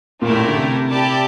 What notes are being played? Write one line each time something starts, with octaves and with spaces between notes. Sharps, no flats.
A#2 A3 E4 G4 A#4
A2
A#2
D3
C3
E4 G4 D5 A5